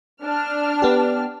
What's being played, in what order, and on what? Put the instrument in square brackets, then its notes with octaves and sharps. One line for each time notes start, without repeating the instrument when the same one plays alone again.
[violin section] D4 F6
[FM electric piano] B3 G4